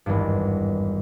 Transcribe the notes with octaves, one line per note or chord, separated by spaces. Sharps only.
G#1 E2 G2